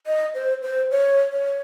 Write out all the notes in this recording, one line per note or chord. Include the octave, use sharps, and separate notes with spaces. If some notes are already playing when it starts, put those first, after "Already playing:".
D#5
C5
C5
C#5
C#5